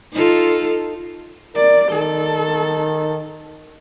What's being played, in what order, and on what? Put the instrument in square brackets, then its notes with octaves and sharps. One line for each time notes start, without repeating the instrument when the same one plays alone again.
[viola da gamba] D#4 F4 A4
[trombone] A#4 [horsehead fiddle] D5
[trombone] D#3 [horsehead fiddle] A4